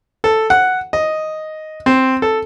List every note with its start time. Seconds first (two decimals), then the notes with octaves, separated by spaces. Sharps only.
0.24 A4
0.50 F#5
0.93 D#5
1.86 C4
2.22 A4